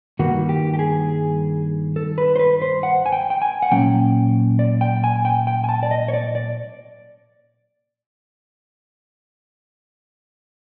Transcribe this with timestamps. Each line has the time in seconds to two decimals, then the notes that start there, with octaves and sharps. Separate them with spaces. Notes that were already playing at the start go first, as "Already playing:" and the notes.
0.19 G2 D#3 G3 A#3 F#4
0.49 G4
0.74 G4
0.79 G#4
1.96 A4
2.18 B4
2.36 C5
2.39 B4
2.62 C5
2.83 F#5
3.06 G#5
3.12 G5
3.30 G5
3.42 G#5
3.62 F#5
3.71 A#2 F#3 A#3 C#4 G5
4.59 D5
4.81 G5
5.04 G#5
5.25 G5
5.47 G5
5.64 G#5
5.69 A5
5.83 D5
5.91 D#5
6.08 C#5
6.13 D5
6.35 D5